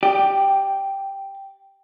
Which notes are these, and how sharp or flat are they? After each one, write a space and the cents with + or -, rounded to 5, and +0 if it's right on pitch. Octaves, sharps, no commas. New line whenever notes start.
G4 +0 D5 +25